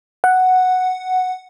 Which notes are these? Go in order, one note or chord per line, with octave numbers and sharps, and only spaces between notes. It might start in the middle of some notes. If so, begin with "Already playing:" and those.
F#5